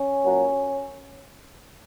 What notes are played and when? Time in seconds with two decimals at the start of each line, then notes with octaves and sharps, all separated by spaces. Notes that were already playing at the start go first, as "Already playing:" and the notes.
Already playing: C#4
0.24 A#2 F#3